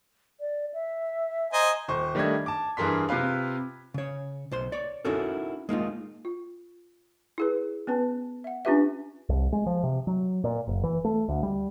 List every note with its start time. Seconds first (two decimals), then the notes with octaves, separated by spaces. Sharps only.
0.40 D5
0.74 E5
1.53 C5 D#5 G#5 A#5
1.88 D#1 C5 C#6
2.15 D#3 G3 A3 D4 D#5 G#6
2.46 A5 D6
2.77 G2 E3 G#4 A#4 C6 B6
3.09 C3 F4 B4 F5
3.94 C#3 C#5
4.52 B1 C5 C6
4.72 C#5 D5
5.05 C#4 D#4 E4 F#4 A4 A#4
5.69 G#3 A#3 D#4 F4
6.25 F4
7.38 E4 G#4 B4
7.87 B3 C#4 B4 A5
8.44 E5 F#5
8.65 C#4 D4 F4 G4 B4 E5
9.29 C2
9.53 G#3
9.66 F3
9.84 C3
10.07 F#3
10.44 A#2
10.67 F#1
10.84 E3
11.05 A3
11.29 D2
11.43 G3